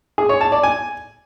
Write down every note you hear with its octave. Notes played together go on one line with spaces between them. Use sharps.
G#4
C#5
A5
D5
G#5